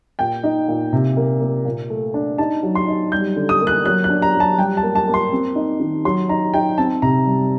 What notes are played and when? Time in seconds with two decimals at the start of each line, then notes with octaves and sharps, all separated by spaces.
0.19 A#2 G5
0.44 D#4
0.68 A#2
0.93 C3
1.17 A#3
1.41 A#3
1.65 A#2
1.90 A3
2.14 D4
2.38 D#4 A5
2.63 F#3
2.75 C6
2.87 D#4
3.12 G3 G6
3.36 D3
3.49 D#6
3.61 A#3
3.67 F#6
3.85 F#3 F#6
4.04 F#6
4.10 D4
4.22 A#5
4.35 F#3
4.40 A5
4.58 G3 G5
4.77 A5
4.83 A#3
4.95 A5
5.08 A#3
5.14 C6
5.32 C4
5.56 D#4
5.80 D#3
6.05 F#3 C6
6.29 D#4 A#5
6.54 D#4 G5
6.78 C4 A5
7.02 C3 A#5
7.26 G3